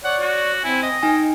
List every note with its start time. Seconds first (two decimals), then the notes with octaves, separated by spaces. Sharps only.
0.04 C#5 D5 F#5
0.21 F#4
0.64 C4 E4 G#5
0.82 D#5
1.03 D#4 G5 G#5